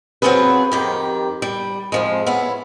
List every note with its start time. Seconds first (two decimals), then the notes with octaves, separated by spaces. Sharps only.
0.22 F#3 C4 C#4 F4 G#4 B4
0.72 F2 D#3 G4
1.42 G3
1.92 F2 F3 G#3
2.26 B3 C#4 E4